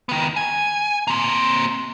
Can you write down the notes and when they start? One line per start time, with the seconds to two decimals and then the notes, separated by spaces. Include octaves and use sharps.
0.09 D#3 B3
0.37 G#5
1.07 A#3 C4